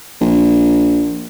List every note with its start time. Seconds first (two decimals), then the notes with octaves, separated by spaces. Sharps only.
0.21 A#1